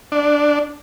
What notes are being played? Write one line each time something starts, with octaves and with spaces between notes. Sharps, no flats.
D4